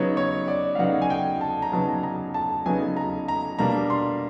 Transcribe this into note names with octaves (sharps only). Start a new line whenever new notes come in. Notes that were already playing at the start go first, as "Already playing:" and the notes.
Already playing: C#3 F#3 B3 D#4 C#5
C#5
D5
F5
C#3 F#3 B3 D#4 F#5
G#5
G5
A5
A#5
C#3 F#3 B3 D#4 A5
A#5
A5
C#3 F#3 B3 D#4 G#5
A#5
A#5
B2 G3 A#3 D4 A#5
C6